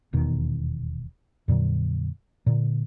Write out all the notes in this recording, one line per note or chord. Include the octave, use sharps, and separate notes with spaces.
D#1 E2 B2 D#3
F2 A#2 D3 F#3
A#2 D3